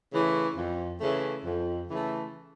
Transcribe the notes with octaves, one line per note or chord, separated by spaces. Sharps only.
C#3 E3 A3
F2
C#3 E3 A3
F2
C#3 E3 A3